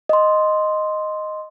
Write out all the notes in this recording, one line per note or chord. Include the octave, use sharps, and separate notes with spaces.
D#5 C6